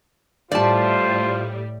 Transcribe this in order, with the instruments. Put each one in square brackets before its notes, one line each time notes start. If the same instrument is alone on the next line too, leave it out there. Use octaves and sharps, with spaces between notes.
[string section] A2 G3 [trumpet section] F4 C5 [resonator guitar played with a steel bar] D5 A5